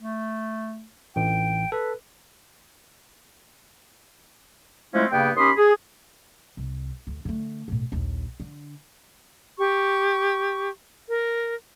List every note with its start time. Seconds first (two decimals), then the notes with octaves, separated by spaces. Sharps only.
0.01 A3
1.16 A1 G5
1.72 A4 B4
4.93 F3 G#3 A3 C4 C#4 E4
5.11 G2 C#3 A#3 B3 G5
5.36 D#2 C#4 G4 B5 C6 D#6
5.56 G#4
6.57 C2
7.07 D2
7.25 D3 A3
7.68 E1 A2
7.92 A#1 D#2
8.40 D3
9.58 G4 C#6
11.09 A#4